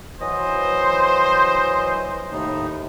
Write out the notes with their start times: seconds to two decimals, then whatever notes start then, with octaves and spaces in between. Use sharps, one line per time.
0.21 E3 F#3 C5 D#5
2.32 D#2 A2 D#4